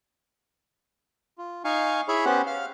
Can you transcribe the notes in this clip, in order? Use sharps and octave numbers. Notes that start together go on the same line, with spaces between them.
F4
D#4 F5 G#5 C#6
E4 G#4 C#5 E5 B5
B3 C#4 G4 C5 F#5
F5 F6